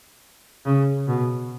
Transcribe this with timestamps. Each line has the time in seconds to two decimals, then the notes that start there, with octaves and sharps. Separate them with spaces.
0.66 C#3
1.07 B2